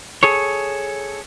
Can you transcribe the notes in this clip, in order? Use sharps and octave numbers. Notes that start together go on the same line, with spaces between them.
G#4 A4 C#5